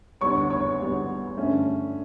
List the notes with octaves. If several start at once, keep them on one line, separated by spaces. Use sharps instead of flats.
D2 D3 G3 B3 C#5 C#6
C#5 C#6
D2 D3 G3 B3
G2 D3 A3 C#4